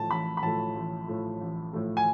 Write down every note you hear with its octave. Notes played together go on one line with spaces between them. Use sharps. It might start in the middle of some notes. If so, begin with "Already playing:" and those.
Already playing: A2 F3 A3 A5
A1 B5
B5
A2 F3 A3 A5
A1
A2 F3 A3
A1
A2 F3 A3
G#5